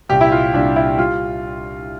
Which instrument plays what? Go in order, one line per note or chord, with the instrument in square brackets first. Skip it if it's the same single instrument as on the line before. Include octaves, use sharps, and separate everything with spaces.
[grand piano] C2 A#2 G3 G4
E4
F4
C2 A#2 G3 D4
E4
G3 F4